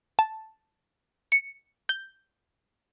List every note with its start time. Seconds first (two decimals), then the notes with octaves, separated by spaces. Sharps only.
0.19 A5
1.32 C#7
1.89 G6